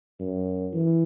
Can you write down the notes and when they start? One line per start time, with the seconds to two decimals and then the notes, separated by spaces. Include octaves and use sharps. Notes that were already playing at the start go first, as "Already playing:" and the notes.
0.20 F#2
0.73 E3